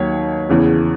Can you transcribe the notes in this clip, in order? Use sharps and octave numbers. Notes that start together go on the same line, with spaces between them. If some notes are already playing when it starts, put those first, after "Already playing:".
Already playing: D#2 D#3 F#3 C#5
E2 C#3 E3